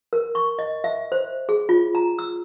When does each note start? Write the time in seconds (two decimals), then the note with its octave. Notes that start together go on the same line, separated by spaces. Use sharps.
0.13 A#4
0.35 C#6
0.59 D#5
0.84 E5
1.12 C5
1.49 G#4
1.69 F4
1.95 A#5
2.19 E6